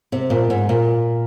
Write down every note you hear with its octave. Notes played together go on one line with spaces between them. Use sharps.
C3
A#2
G#2
A#2